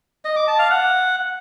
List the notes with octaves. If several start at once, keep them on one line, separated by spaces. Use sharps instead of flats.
D#5
D6
A5
F5
F#5